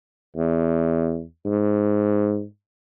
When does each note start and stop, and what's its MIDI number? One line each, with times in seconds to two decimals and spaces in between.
0.37 1.23 40
1.46 2.43 44